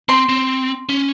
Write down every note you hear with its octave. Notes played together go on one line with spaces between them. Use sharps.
C4 C6
C4
C#4